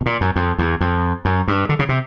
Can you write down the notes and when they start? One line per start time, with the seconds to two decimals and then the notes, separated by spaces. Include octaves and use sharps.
0.01 B2
0.06 A#2
0.21 F#2
0.36 F2
0.58 E2
0.81 F2
1.25 F#2
1.48 G2
1.69 D3
1.79 C#3
1.89 C3